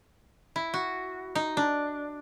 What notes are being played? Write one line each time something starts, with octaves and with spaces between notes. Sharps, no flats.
E4
F#4
D#4
D4